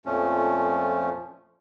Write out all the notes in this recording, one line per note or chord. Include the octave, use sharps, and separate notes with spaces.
F2 A#2 F3 A3 C#4